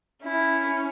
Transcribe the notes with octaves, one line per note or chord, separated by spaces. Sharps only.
C#4 E4